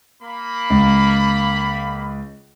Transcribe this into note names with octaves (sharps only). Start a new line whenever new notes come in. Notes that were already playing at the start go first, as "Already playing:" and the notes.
A#3 B5
C#2